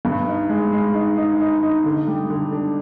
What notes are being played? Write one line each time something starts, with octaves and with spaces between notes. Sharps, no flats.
G2
D#4
G#3
G#3
D#4
D#4
D#4
D#4
D3
G3
D3
D4